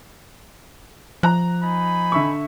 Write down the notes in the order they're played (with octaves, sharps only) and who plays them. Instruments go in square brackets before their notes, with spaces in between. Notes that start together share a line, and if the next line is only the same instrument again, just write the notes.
[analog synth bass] F3 [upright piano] A#5 F#6
[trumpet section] D#4 G#5 B5
[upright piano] D3 E5 C#6